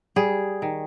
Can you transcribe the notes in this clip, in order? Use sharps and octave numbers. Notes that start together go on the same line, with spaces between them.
G3 G#4
D#3